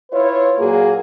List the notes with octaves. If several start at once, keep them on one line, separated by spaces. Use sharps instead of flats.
E4 F4 B4 C#5
A#2 F#3 A#3 F#4 G#4